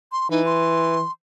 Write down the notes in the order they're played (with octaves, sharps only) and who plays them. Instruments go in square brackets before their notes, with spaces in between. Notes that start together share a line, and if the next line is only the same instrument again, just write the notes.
[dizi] C6
[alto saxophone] E3 [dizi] D#4
[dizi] C6